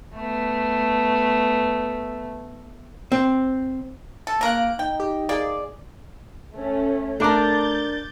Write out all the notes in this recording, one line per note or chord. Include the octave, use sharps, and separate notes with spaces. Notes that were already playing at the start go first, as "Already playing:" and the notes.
A3 B3
C4
A4
C#3 A#3 A#4 F#6 D7
D#4 G5
G4
A#3 G#4 D5
A3 C#4
A3 D4 A#4 D6 G6 A6